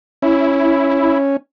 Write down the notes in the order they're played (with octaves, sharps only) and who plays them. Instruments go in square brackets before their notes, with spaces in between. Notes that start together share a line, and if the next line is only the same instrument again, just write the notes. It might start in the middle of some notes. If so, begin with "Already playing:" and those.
[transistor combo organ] C#4 [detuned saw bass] E4